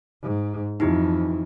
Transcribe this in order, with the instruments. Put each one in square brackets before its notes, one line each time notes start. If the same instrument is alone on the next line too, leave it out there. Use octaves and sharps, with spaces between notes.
[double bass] G#2
[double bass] F2 E3 [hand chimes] D#4 E4 G4